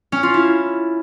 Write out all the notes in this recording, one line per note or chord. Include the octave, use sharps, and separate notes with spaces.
C#4
F4
E4